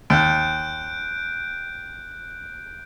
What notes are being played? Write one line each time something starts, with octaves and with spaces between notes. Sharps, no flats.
D#2 F#6 G6 D7